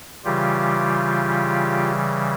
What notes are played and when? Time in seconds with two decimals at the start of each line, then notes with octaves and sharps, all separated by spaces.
0.25 C#3 E3 G3 F4 G4